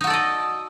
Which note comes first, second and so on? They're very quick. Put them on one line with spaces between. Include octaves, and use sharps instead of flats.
D#4 F#4 A4 D5 D#5